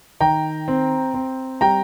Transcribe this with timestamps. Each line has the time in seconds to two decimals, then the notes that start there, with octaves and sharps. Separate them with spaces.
0.21 D#3 G5 A#5
0.68 C4
1.14 C4
1.61 G3 G5 A#5